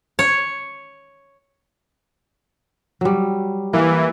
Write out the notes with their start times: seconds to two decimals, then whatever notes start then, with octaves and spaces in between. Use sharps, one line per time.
0.19 C#5
3.01 F#3 G3
3.73 E3 A#3